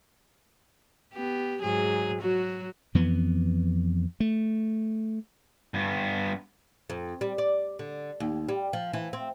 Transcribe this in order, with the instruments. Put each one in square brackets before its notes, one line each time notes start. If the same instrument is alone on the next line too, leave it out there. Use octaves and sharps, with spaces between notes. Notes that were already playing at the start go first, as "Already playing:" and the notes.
[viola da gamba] B3 G4
G#2 F#3 G#4
F#3 F#4
[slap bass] F2 E3 B3
A3
[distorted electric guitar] G2 B3
[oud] F2
G3
D5
D3
D#2
G3
F3
E3
C4